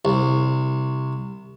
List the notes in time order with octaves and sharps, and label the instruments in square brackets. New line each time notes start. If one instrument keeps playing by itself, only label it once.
[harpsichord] C2